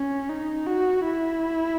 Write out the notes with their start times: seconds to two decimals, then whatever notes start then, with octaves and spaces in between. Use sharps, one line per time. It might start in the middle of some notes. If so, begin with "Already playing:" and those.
Already playing: C#4
0.30 D#4
0.67 F#4
1.04 E4